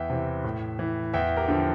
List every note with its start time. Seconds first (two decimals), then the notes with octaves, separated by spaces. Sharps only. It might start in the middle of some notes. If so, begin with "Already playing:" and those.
Already playing: E2 E5 G5
0.10 C3 E3
0.44 A2
0.79 E3
1.13 E2 E5 G5
1.37 G4 A#4
1.48 D3 F3